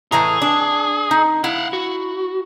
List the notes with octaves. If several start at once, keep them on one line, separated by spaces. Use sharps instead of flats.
A2 E3 G#4 A#5
D4
D#4
E4 F5 F#5
F#4